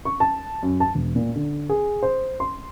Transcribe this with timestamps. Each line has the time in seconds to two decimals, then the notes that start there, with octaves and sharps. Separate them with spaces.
0.05 C#6
0.20 A5
0.63 F#2
0.80 A5
0.94 E1
1.16 A#2
1.36 D3
1.69 G#4
2.03 C5
2.40 C6